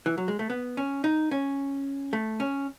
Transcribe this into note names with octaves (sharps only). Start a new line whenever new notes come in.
E3
F#3
G#3
A3
B3
C#4
D#4
C#4
A3
C#4